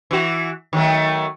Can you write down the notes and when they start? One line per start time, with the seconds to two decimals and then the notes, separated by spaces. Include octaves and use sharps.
0.11 E3 F#4
0.73 D#3 F#3 A3